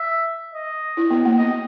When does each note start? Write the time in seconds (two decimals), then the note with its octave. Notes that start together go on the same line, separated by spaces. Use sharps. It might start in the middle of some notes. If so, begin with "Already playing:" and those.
Already playing: E5
0.54 D#5
0.97 E4
1.11 B3
1.25 A#3
1.38 B3 D#5